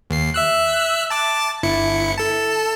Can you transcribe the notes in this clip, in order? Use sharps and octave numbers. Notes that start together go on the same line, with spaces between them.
D#2 C7
E5 E6 F#6
A5 D6 A6
G1 E4 C#7
A4 A5